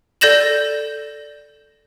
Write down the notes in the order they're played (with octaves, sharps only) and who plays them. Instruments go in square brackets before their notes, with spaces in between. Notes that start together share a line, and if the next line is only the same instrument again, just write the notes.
[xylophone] A4 D5 G6 A#6 E7 F#7